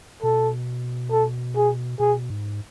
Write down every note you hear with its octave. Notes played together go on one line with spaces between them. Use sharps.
B2 A4
A4
G#4
B2 G#4
G#2